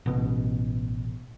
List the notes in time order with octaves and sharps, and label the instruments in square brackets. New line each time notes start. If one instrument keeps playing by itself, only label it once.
[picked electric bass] A1 B2